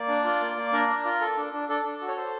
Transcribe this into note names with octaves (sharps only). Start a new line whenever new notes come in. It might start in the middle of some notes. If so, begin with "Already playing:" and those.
Already playing: A#3 D5
D4
F4
A#3
A#3
D4 A#4
D4
F4
A4
D4
D4
D4 A4
D4
F#4
C#5
A4 C5